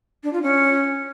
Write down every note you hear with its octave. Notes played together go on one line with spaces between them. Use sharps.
D4
F4
C#4